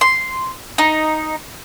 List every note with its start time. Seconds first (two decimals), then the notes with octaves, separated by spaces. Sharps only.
0.01 C6
0.78 D#4